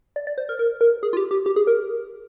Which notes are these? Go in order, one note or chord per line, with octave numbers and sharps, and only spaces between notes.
D5
D5
C5
A#4
A#4
A#4
G#4
F4
G4
G4
G4
G#4
A#4